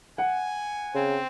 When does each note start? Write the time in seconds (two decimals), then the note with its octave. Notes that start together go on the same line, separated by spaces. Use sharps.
0.18 F#5 G#5
0.94 C#3 C4